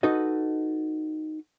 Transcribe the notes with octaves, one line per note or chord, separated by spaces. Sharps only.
D#4 F#4 A4 B4 D#5